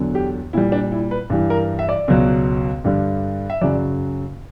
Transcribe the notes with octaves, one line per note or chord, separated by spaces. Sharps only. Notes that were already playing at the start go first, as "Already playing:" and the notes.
Already playing: E2 D3 F#3
G4
A#2 G3 E4
D4
E4
B4
G2 E3 G3
A#4
E5
D5
C#2 B2 F#3
G2 D3 G3
E5
F#2 C#3 F#3 D5